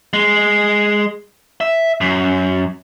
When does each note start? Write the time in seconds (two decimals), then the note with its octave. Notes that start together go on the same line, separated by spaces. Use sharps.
0.13 G#3
1.61 E5
2.01 F#2